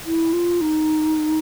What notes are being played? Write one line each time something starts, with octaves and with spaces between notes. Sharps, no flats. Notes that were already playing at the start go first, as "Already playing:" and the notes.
E4
F4
D#4